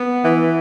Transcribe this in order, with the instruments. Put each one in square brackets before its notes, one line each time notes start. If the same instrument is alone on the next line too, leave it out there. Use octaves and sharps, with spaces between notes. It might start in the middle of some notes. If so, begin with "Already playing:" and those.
Already playing: [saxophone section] B3
E3